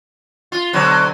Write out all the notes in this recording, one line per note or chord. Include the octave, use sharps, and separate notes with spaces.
F4
B2 D3 F#3